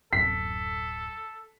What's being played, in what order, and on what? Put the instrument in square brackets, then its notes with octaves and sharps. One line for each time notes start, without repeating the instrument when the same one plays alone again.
[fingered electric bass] D1 F#2 [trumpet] A4 [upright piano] B6